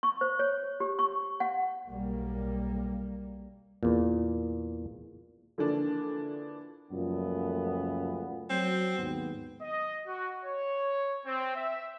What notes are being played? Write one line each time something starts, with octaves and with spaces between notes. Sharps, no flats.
C#6
C5
C#5
G4
C#6
F#5
B1 G3 A#3
E2 A#2
D3 E3 F3 A#3 D4
C#2 F#2 A#2 F3 A3 B3
F#3 C4
D#2 G#2 B3
D#5
F#4
C#5
C4
E5